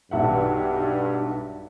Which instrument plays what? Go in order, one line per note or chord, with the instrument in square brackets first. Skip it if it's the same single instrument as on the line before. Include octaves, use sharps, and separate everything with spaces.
[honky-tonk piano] B1 E5 F#5 [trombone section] G2